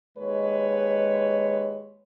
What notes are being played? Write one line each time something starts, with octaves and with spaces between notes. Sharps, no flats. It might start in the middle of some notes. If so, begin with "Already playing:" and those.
D#2 G#3 B4 C#5